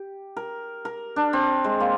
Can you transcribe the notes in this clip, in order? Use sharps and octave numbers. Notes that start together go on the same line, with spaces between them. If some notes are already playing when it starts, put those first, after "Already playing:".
Already playing: G4
A#4
A#4
D4
C4
G#3
A#3